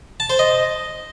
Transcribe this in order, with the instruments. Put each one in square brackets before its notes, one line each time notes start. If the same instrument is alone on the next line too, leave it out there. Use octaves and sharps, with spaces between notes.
[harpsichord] A5
C5
D#5